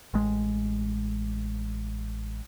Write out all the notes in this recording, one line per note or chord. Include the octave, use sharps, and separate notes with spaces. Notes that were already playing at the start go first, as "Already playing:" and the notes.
A1 G#3